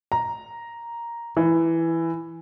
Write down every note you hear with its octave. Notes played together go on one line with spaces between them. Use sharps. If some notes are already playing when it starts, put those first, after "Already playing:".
A#5
E3